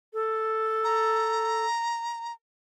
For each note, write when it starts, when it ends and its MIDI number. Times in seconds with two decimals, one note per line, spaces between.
0.14 1.66 69
0.84 2.33 82